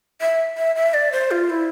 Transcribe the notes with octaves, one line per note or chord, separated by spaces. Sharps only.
E5
E5
E5
D5
C5
F4
E4